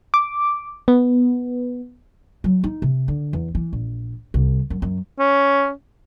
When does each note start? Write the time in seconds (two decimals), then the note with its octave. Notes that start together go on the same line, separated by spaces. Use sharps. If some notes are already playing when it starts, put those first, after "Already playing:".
0.14 D6
0.88 B3
2.44 F#3
2.64 D#4
2.82 C3
3.08 D3
3.33 E2
3.55 E3
3.73 A#1
4.34 C2
4.70 F#2
4.82 F#2
5.19 C#4